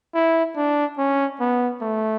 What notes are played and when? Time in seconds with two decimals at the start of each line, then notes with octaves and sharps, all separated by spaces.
0.14 E4
0.56 D4
0.98 C#4
1.40 B3
1.81 A3